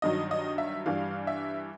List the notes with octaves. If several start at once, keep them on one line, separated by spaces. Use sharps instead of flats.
G2 D#3 F#3 D#5
D#5
E5
G2 E3 G3 F5
E5